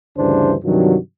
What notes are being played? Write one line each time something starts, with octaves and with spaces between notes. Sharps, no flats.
D2 G2 C#3 E3 D4 C5
G2 C3 D#3 F3 F#3